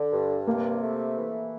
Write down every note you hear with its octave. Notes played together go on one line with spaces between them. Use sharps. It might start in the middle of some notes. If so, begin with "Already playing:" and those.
Already playing: D3
G2
C3 A#3
A3
E3